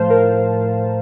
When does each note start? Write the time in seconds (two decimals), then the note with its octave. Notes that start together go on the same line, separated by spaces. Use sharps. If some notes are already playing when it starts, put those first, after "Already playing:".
Already playing: A2 F3 A3 C5 F5 A5
0.10 A#4